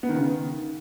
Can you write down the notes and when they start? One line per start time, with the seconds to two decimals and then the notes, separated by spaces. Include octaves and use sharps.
0.03 B3
0.09 D#3
0.15 C#3
0.21 D#3